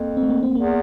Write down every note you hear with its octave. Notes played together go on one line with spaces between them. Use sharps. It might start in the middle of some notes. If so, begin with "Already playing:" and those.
Already playing: F2 A#3
C4
A3
A#3
C4
E2 A#3